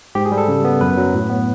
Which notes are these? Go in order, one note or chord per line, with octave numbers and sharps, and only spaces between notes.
G#2 G4
G#4
G3
A4
C#3
B3
F#2 B4
F#3
A2
B3